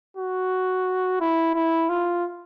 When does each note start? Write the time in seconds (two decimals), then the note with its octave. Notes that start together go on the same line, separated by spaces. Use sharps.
0.17 F#4
1.21 E4
1.55 E4
1.89 F4